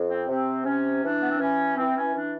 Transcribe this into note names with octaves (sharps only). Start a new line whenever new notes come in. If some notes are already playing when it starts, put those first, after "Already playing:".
Already playing: F2
C4
C3 C4
C3 C#4
E3 D4
B3
C4
E3 C#4
E3 C4
C#4
E3 D4